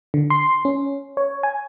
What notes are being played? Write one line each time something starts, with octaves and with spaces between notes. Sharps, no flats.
D3
C6
C#4
C#5
G#5